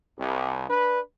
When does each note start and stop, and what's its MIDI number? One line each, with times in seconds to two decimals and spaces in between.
0.18 0.67 36
0.69 0.99 62
0.69 0.99 71